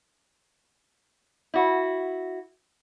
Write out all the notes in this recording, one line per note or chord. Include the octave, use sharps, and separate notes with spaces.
E4 F#4